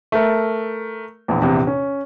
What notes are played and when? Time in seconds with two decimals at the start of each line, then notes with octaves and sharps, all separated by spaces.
0.12 A3 A#4
1.28 A#1 E2
1.42 A#1 E2 C3
1.67 C#4